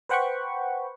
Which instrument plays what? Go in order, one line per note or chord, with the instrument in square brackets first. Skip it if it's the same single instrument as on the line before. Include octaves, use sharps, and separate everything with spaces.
[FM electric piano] B4 C5 F#5 G5 B5 C#6